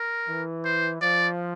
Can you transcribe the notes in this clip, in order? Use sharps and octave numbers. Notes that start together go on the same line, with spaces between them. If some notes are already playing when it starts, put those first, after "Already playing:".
Already playing: A#4
E3
C5
F3 D5